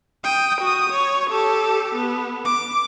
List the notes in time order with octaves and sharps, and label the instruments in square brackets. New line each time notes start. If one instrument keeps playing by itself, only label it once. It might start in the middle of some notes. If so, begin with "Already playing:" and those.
[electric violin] G5 D#6
F#4 D#6
C#5
G4 A4
B3
D6